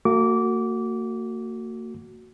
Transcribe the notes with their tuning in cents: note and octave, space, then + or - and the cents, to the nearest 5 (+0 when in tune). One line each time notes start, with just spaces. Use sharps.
A#3 -45 F#4 +0 D6 -20